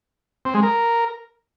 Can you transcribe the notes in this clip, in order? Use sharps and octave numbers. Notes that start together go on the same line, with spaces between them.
C4
G#3
A#4